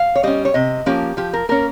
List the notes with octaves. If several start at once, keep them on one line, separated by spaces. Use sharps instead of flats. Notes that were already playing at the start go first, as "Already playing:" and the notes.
Already playing: F5
C#5
G3 C#4 D#5
C#5
C3 D#5
F3 A#3 C#4 G4
F3 G4
A#4
A#3 C#4 A#4